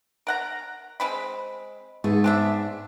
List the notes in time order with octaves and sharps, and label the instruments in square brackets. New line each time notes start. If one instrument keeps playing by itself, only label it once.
[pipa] A#4 F#5 A#5
G#3 C4 B5
[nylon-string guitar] G#2 B3 G#4 [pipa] A3
[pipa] C4 D4 E5